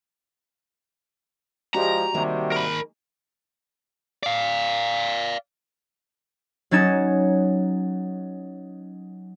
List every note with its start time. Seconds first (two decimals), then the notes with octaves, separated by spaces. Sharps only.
1.74 F3 G#3 F#4 G4 D5 A#5
2.14 C3 D#3 G3 A#3 F#4 G#4
2.52 A#4 B5
4.23 D5 F5
6.71 F#3 C#4 D#4 G#6 A6 E7